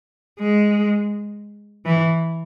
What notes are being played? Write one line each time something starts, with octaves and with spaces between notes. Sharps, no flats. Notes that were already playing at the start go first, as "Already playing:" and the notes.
G#3
E3